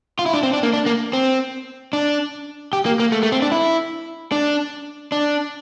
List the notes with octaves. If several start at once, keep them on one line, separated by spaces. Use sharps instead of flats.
F4
E4
D4
C4
D4
A#3
D4
A#3
C4
D4
G4
A#3
A#3
A3
A3
C4
D4
E4
D4
D4